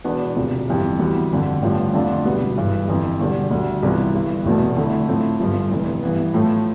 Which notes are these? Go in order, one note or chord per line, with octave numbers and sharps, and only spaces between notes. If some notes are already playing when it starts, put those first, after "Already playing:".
E1 E2 B2 B3 D4
E1 D2 C3 F3
G1 F2 C3 E3 G3
D2 C3 E3 G3 B3
G1 F2 D3
A1 G2 D3 F3
F2 D3 A3 D4 F4
E1 D2 C3 G3 B3
G1 G2 E3
G1 F2 E3
E1 E2 D3 G3
D2 D3 G3
C2 C3 E3 B3 F4
G1 G2 E3
F1 E2 B2 A3
F2 D3 A3 E4
A2 F3 A3 C4 E4
G1 G2 F3
F1 F2 E3
G2 E3 B3
A2 F3 A3 E4